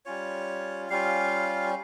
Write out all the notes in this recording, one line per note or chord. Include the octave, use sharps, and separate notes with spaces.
G3 C#4 F4 C#5
G3 C#4 F4 F5